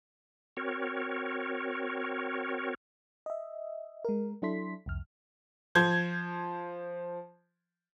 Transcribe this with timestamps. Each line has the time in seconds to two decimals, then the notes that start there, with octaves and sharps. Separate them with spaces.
0.57 C4 F#4 A#4 C#5
3.26 D#5 E5
4.05 G#3 A#4
4.42 F#3 D4 E4 A4 C6 B6
4.86 C2 F2 F6
5.75 F3 C5 G6 G#6